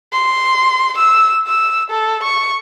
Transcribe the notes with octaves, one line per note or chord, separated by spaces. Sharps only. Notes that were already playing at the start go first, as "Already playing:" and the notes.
C6
E6
E6
A4
C#6